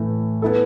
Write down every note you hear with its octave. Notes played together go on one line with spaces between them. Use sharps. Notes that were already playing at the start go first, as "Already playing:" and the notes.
Already playing: A2 E3 A3
B3 E4 A4